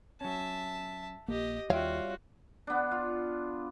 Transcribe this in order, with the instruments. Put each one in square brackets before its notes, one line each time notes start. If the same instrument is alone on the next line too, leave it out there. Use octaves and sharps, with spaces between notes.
[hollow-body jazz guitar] F#3 C#4 [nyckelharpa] E5 A5
[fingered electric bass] A#1 A#3 [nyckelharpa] G4 D#5
[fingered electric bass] D#2 [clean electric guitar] G3 C#5 F5 [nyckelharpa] F4 F#4 [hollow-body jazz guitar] E5 G5
[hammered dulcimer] B3 D4
F4